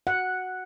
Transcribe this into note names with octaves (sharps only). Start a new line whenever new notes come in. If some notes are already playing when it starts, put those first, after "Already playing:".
F#5